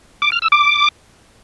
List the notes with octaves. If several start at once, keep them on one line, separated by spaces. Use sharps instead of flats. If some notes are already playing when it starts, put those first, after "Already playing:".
D6
F6
E6
D6